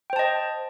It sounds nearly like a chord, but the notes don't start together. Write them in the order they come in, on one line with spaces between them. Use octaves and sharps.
G5 C5 A5 D#5